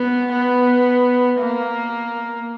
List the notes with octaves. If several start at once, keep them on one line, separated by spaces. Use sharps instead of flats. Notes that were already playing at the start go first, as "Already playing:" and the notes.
Already playing: B3
B3
A#3